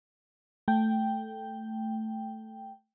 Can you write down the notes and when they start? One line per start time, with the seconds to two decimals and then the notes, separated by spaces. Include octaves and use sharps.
0.68 A3 G5